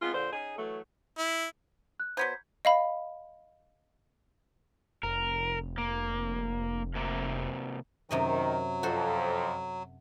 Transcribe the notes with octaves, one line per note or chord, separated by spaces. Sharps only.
G#3 B3 C4 F4
A#2 D3 C5
C#4 D#4 G#4
E3 F#3 A3
E4
F#6
F#3 B3 C5 G6 G#6 B6
D#5 F5 B5
F1 A#4
A#3
C3 A#3
F#2 C3 D#3 F#3 D#5
F2 F#4 A4 C5